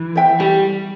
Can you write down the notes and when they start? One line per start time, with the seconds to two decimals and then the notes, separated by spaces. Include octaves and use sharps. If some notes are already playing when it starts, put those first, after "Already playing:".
Already playing: E3
0.15 C5 E5 G5
0.40 G3 G4